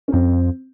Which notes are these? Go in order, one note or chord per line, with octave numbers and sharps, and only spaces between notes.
C#4
F2 C4